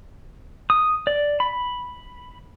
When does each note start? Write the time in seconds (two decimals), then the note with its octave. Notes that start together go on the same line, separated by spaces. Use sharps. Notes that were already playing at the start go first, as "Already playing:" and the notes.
0.70 D#6
1.07 D5
1.40 B5